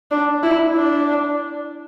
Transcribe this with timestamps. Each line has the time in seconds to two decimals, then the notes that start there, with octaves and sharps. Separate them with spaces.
0.11 D4
0.43 E4
0.75 D4